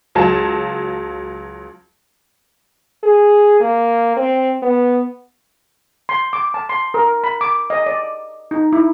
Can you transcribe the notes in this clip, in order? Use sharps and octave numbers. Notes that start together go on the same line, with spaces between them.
C#2 F#3 F4 A5
G#4
A#3
C4
B3
C6
D6
A5
C6
A#4
B5
D6
D#5
D5
D#4
E4